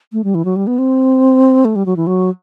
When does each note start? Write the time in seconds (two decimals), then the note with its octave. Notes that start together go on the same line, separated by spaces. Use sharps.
0.13 A3
0.24 G3
0.35 E3
0.45 F#3
0.56 G3
0.67 B3
0.78 C4
1.65 A3
1.76 G3
1.86 F#3
1.97 E3
2.07 F#3